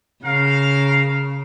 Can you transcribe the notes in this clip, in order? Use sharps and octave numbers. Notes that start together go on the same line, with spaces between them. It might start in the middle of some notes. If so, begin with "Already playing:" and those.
C#3 A#4 F5